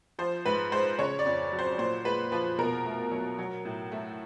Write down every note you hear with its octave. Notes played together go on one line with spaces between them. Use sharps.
F3 C5
G#2 B4
G#3 C5
C#3 C#5
D5
F2
F#3
C5
A#2 C5
G#3 B4
F3 B4
B2 A#4
A3
F#3
F#3
A2
A3